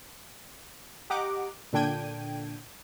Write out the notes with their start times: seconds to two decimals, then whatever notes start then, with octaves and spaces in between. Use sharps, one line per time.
1.10 G4 D#5 F#5 A#5 D6
1.73 A#2 D3 D4 G5 G#6 D#7